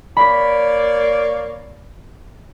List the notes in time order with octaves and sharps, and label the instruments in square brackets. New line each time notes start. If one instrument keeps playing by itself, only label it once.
[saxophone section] A#3 C#5 D5 [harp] B5 B6